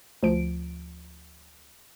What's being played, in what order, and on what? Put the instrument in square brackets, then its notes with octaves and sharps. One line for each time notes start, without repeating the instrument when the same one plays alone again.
[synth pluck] D2 F3 D7